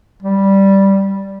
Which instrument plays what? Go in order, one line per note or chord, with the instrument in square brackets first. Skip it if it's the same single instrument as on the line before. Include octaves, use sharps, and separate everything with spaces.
[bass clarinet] G3